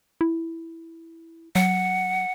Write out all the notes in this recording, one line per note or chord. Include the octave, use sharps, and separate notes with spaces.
E4
F#3 F#5